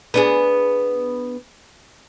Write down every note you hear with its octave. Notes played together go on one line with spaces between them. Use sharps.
B3 D4 G#4